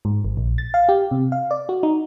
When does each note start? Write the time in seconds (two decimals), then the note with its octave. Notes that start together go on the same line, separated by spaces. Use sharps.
0.05 G#2
0.25 G#1
0.37 A#1
0.58 A6
0.74 F5
0.89 G4
1.11 C3
1.32 F5
1.51 D5
1.69 F#4
1.83 D#4